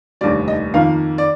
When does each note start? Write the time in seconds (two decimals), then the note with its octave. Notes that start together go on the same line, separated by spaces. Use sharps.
0.21 F1 D#2 D3 G3 D5
0.48 D#5
0.74 F2 D#3 A#3 F5
1.18 D5